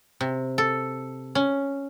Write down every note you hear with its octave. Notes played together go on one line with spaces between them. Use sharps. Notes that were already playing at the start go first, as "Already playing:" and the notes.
C3
A4
C#4